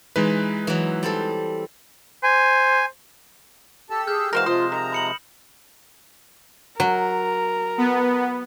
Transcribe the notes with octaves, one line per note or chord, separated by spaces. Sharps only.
E3 G#3 D#4 B4
E3 F#3
G3 C4 A4
C5 G#5
G4 A4 A5 E6
G#4 F6 G6
E3 G#3 F#4 A#4 C5 F5 A#6 E7
C3 F3 G#3 F4 C5 D#6
D#3 A#5
B5 C#7 F#7
F#3 A#4
B3